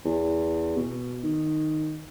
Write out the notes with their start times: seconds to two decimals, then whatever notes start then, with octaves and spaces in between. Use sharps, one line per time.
0.05 E2
0.77 B2
1.23 D#3